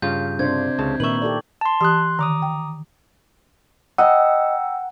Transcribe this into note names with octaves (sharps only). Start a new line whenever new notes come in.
G2 C#3 F4 G6
C3 D4 C5 G#6
C#2 C#3 A5
A#2 D#3 D#4 B4 E5 C#6 F#7
G4 A4 D5
A5 C6
E3 G4 C6 D#6 F#6
D3 D#3 A#5 D6 D#6
G5
D#5 F#5 G5 A#5 E6